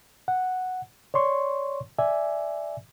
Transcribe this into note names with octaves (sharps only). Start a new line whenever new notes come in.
F#5
C#5 D5 C6 C#6
D5 E5 G#5